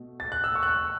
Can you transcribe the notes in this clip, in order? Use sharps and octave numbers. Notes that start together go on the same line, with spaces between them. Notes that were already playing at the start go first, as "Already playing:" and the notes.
Already playing: B2 A3
A6
F#6
E6
C#6
F#6
E6